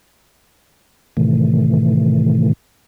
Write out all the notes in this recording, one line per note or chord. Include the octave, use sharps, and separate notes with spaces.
A2 C3 D#3 E3 A3